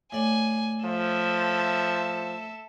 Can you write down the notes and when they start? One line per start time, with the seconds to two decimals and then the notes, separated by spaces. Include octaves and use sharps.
0.12 A2 D5 G#5
0.85 F3 A4 E5